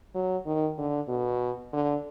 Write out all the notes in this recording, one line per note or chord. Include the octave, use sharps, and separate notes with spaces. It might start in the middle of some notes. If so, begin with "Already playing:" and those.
F#3
D#3
D3
B2
D3